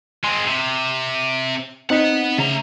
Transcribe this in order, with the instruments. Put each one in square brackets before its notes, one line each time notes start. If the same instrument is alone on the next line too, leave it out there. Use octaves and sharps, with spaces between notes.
[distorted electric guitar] G#3 C4 [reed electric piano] C6
[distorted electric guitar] C3
[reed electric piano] C4 D#4 D#5 [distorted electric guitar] B4 F#5
[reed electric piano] C#3 [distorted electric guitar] A3 A#5